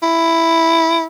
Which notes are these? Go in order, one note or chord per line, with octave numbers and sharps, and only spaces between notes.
E4